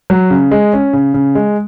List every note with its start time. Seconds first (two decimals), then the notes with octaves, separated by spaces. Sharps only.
0.10 F#3
0.30 C#3
0.51 G#3
0.73 C#4
0.93 C#3
1.14 C#3
1.35 G#3